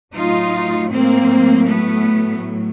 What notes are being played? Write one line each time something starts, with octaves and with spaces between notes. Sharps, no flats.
A2 F#3 D#4 F4
A#3 C4
A3 B3